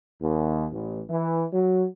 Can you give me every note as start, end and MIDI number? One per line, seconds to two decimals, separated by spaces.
0.22 0.66 39
0.72 1.02 33
1.10 1.45 52
1.53 1.86 54